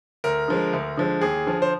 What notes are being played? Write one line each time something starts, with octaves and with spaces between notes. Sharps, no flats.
D2 A#4
D3 F3 G#3
D2
D3 F3 G#3
D#2 G#4
D3 F3
C5